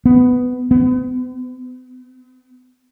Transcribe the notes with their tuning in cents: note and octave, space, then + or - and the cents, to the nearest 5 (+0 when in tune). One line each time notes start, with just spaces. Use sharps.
B3 +10
B3 +45